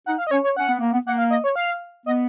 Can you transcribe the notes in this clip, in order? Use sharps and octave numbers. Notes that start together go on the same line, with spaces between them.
D#4 F#5
F5
D#5
C#4 C#5
C#5
C#4 F#5
B3
A#3
B3
A#3 F#5
F5
D#5
C#5
F5
B3 D#5